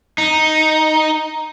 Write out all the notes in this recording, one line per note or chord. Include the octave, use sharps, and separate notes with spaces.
D#4